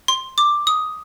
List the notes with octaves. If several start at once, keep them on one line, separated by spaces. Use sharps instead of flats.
C6
D6
D#6